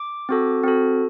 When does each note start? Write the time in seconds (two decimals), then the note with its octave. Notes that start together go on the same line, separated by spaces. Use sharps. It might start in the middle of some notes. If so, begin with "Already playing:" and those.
Already playing: D6
0.29 C4 F#4 A4
0.63 C4 F#4 A4